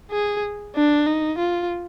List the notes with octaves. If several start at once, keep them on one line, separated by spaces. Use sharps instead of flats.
G#4
D4
D#4
F4